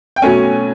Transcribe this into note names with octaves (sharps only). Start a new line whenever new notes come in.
G5
B2 F#3 A3 C#4 G#5